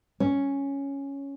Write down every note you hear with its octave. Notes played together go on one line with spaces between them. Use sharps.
C#4